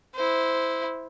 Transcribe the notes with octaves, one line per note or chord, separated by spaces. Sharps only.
E4 C5